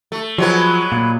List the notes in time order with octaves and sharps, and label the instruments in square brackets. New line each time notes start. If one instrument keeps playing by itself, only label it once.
[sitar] A3
[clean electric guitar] F3 [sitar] F#3 G#3 B3
[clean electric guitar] A#2